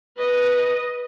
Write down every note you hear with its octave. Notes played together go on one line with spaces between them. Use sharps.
B4 D#5